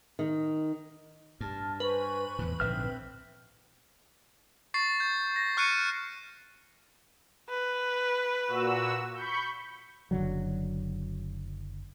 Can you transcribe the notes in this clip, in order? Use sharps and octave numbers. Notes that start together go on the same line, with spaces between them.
D#3
G2 A5 F6
B4 C5 G#5 C#6
E2 A2
A#1 G#2 D3 C4 E5 G5 F6
C#6 A6 C7
G6
A#6
C#6 F6 F#6 C7 C#7 D#7
B4
A#2 F#4 E6
B5 C#6 G6
F#1 D3 F#3